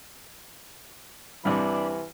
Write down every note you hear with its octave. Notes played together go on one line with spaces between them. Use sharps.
C2 G2 C3 E3 D4 B5